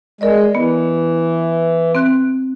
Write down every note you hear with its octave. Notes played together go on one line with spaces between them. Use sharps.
G#3 A#4 D5 D#5
E3 B3
C4 F#6